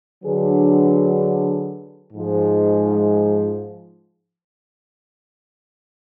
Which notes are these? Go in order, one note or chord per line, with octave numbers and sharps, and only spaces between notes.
D3 F#3 D4 G#4 B4
G#2 F3 G#3